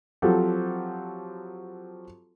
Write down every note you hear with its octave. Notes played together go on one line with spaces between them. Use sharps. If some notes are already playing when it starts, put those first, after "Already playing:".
F3 F#3 C4 G4 A4